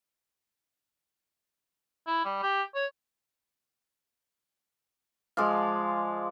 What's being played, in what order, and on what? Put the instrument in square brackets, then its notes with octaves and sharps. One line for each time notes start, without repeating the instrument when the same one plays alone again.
[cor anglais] E4
G3
G4
C#5
[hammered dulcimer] F3 G#3 D5 F5